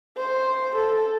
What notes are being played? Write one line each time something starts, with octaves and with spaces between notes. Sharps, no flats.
C5
A4